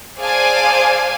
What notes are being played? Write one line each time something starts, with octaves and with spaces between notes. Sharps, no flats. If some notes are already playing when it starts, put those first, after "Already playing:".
G#4 C5 D5 F5 G#5 A5